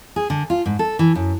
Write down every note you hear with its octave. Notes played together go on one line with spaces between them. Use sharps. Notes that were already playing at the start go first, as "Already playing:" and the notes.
G#4
D3
F4
G#2
A4
E3
F#2